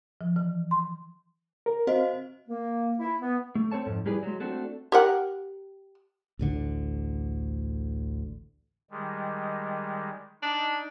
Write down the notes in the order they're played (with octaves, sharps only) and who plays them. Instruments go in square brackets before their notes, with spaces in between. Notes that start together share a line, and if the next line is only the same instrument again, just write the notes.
[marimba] F3
E3
C6
[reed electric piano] A#4
[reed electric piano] C4 F5 [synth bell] F#4 C5 D#5
[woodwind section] A#3
E4
B3
[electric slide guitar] A3
C4 A4 C#5 A5
F2 G#2
G3 E4 G4 G#4 B4 D5
F#3 G#3
A3 C4 D4 F#4 A4
[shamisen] G4 A#4 F#5
[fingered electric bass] A1 D2 D3
[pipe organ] D#3 G3 G#3
[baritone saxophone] D4 [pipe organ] D#4